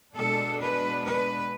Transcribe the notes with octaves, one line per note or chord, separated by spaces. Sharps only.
B2 G#3 D4 A4
B4
B4